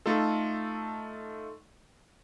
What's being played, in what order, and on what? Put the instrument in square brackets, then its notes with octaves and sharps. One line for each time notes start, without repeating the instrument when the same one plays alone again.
[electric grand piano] A3 D#4 F4 A4